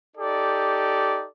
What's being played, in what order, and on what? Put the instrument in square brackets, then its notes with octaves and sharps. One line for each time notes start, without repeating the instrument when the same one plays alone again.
[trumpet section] D#4 G4 A4 D5